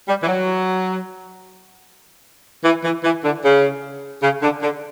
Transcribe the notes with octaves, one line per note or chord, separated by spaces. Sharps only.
G3
E3
F#3
E3
E3
E3
D3
C#3
C#3
D3
D3